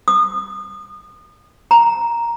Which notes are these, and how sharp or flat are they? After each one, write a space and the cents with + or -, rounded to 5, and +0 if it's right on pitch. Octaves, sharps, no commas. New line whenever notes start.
D#6 -35
A#5 +5